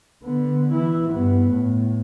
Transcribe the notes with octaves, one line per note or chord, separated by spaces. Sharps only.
D3 B3
E3 E4
G2 B3
A2